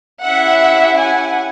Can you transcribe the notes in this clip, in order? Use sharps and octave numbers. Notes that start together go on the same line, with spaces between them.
C#4 E4 G4 E5 F#5
F#5 G#5